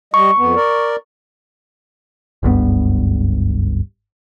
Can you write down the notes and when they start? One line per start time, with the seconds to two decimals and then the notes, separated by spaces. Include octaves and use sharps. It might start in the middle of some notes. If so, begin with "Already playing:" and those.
0.14 G3 D#5 C#6
0.38 F2 B3
0.56 A#4 D5
2.43 F#1 C#2 G2 B3